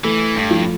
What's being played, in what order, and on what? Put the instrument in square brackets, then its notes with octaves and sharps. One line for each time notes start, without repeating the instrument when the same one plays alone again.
[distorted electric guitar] E3 [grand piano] A3
[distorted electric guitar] G2
[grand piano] F3